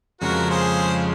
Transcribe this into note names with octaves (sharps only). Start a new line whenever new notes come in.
F2 C#3 G#3 F#4 A#4
G#4 C5